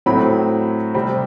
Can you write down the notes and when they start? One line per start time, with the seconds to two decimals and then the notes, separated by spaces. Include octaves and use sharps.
0.06 A2 F#3 C4 B5
0.95 C3 G3 C4 B5